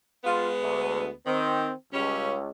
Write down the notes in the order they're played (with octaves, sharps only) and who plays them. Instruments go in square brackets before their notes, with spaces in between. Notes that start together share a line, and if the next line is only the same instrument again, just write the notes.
[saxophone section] G#3 B3 [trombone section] F4
[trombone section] D2
[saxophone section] D#3 [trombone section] C4
[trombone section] C#2 [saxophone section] G3 C#4